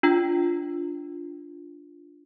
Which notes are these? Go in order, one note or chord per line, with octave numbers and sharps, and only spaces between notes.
D4 F4 G5